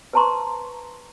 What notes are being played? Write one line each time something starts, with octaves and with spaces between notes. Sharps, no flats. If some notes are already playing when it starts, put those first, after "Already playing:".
B4 C5 A5 A#5 C6 C#6